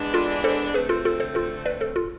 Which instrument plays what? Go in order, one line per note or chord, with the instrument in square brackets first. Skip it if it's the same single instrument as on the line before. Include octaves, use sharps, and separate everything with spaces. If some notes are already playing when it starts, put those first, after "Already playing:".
Already playing: [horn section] E3 G#3 B3 D4
[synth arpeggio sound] F4 A4
A4 C5
[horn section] D3 A3 C4 [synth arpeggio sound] G#4 B4
[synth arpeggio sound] F4 A4
F4 A4
A4 C5
F4 A4
B4 D5
A4 C5
F4 A4